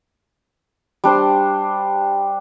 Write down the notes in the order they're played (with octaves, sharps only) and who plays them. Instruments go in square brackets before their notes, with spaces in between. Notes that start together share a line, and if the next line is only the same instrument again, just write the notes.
[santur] G3 D4 C5 C6